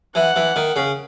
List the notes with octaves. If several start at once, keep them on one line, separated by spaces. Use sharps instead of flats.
E3 F#5
E3
D#3
C#3